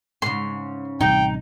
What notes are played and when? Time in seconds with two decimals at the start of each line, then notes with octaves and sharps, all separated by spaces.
0.22 G#2 C#3 C6
1.01 A1 C3 G3 D#4 G5